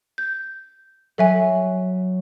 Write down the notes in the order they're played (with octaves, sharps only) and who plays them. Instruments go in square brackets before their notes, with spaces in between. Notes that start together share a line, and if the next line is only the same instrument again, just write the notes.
[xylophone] G6
[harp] F#3 [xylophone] A4 E5 G#5